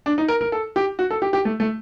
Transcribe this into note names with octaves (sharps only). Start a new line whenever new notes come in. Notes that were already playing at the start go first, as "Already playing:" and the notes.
D4
D#4
A#4
A#4
A4
G4
F#4
A4
G4
G4
A3
A3